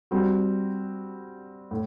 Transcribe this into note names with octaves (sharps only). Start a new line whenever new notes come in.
G3 C4 F#4
A2